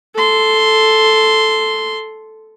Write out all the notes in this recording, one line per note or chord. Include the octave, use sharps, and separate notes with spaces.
A4 C6